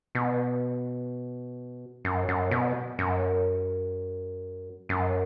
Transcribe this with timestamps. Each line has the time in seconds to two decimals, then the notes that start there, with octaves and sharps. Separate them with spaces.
0.15 B2
2.05 F#2
2.28 F#2
2.51 B2
2.99 F#2
4.89 F#2